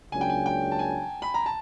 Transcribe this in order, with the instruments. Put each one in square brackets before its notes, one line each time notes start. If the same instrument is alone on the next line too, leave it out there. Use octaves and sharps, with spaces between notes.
[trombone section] C#2 C#3 F#3 A#3 D4 [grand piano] G#5
[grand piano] G5
G#5
G5
A5
G#5
B5
A#5
A5